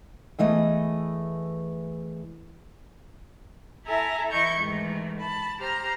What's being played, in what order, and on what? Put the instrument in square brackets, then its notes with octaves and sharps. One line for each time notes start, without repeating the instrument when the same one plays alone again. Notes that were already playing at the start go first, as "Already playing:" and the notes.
[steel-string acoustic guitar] E2 E3 A3 D#5
[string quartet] E4 A4 E5 G#5 A#5
E3 E4 D#5 C#6 G6
G#2 D#3 E3 A3
A5 B5
G4 C5 A#5 F6